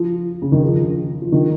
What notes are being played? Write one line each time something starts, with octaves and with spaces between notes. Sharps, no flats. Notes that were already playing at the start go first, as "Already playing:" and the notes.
Already playing: F3
C#3
D#3
F3
F3
D#3